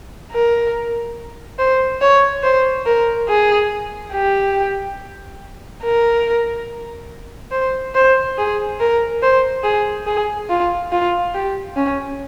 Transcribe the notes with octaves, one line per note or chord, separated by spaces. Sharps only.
A#4
C5
C#5
C5
A#4
G#4
G4
A#4
C5
C5
G#4
A#4
C5
G#4
G#4
F4
F4
G4
C#4